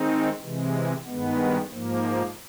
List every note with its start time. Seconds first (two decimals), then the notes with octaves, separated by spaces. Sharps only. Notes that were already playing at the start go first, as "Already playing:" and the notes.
Already playing: D#3 G#3 C4 D#4
0.41 C3 E3 G#3
1.06 G2 D#3 G#3 B3
1.71 G#2 F3 A#3